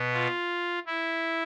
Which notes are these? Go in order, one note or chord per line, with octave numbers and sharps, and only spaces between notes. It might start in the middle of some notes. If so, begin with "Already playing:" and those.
Already playing: B2 B3
F4
E4